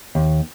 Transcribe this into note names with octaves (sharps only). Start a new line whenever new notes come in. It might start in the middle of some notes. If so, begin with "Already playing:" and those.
D#2